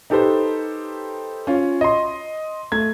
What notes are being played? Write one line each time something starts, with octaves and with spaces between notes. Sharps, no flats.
D#4 G4 A4 B4 C5
C#4 F4
D#5 C6
A3 G#6